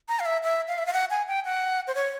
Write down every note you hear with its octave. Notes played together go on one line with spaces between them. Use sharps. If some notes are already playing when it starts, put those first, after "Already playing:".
A#5
F5
E5
E5
F5
E5
F5
F#5
G#5
G5
F#5
C5
C#5